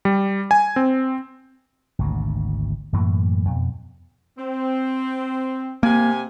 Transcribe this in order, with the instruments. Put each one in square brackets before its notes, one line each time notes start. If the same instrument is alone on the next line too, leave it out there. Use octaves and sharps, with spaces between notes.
[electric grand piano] G3
G#5
C4
[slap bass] G#1 D2 B2
F#2 A2 E3 A#3
F2 B2
[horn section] C4
[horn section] C3 G4 G#5 [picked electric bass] A#3